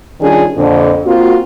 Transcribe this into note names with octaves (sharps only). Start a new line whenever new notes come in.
D#3 G3 C#4 D4 F4 G#4
F2 A#2 D3
A#3 C4 F4 F#4